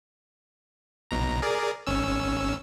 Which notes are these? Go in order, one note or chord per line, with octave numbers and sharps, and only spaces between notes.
B1 B2 A#5
G#4 A#4 D5
G#1 C#4 E6